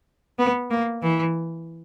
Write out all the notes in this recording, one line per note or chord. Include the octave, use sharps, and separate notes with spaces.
B3
A#3
E3